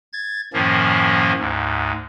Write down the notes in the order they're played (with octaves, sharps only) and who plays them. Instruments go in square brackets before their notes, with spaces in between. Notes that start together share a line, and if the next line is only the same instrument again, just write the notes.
[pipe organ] G#6 A6
F#2 A2 D#3 F3 A#3 C#4
D2 G#2